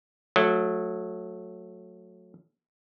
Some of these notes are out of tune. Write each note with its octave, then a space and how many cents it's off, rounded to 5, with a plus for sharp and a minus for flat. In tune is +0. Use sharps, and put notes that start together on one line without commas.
F#3 -20 A3 +0